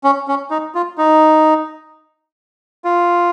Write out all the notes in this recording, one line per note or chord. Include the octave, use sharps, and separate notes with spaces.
C#4
C#4
D#4
F4
D#4
F4